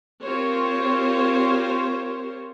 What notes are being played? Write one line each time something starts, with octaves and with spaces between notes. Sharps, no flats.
C4 F4 G4 A#4 C5 C#5